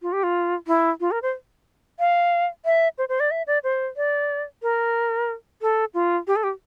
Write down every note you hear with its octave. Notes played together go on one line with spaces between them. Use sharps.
F4
G4
F4
E4
F4
A#4
C5
F5
E5
C5
C5
D5
E5
D5
C5
D5
A#4
A4
F4
G4
A4
G4